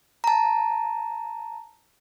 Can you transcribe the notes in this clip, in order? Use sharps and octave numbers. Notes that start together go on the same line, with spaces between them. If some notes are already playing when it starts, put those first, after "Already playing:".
A5 A#5